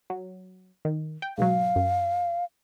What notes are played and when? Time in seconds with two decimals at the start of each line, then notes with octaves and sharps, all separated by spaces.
0.10 F#3
0.85 D#3
1.22 G5
1.38 G#2 B2 F#3 F5
1.76 F#2